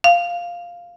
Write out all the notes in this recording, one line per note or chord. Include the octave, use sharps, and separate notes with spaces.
F5